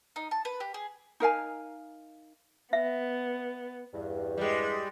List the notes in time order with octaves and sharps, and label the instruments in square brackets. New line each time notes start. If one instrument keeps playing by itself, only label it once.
[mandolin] D#4
A5
B4
G4
G#4
[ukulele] D#4 A#4 F5 G#5
[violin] B3 [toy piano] E5
[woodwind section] E2 G2
[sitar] G3 G#3